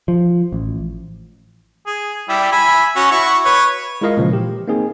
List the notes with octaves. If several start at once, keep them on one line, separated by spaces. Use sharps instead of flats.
F3
A1
G#4
G3 E4 G4
E5 G#5 B5
C#4 F#4
E4 F#4 C#6
B4 C#5
G#3 E4 F4 A#4 D#5 F5
A#2 C#3 E3 F3 G#3
G4
A#3 C4 D#4 G#4